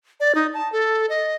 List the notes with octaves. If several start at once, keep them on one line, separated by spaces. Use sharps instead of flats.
D5
D#4
A5
A4
D#5